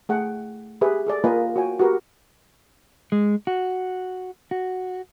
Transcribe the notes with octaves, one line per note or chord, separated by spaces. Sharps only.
A3 G#4 F#5 G5
G4 G#4 B4 E5
G#4 A4 D5
A#3 F4 A#4 B4 D#5 G#5
F#4 C#5 G5 G#5
F#4 G4 A#4 B4
G#3
F#4
F#4